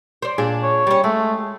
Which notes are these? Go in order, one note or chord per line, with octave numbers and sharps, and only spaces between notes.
C5 D5
A#2 D4 G#4
C#5
G3 C#4
G#3 A3